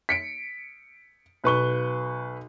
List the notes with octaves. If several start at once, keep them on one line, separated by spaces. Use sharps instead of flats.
B6 C#7 D7
B1 B4 C#6 G7